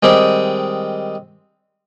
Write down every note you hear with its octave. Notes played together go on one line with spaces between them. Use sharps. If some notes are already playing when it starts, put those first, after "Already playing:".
D#3 G3 G#3 C4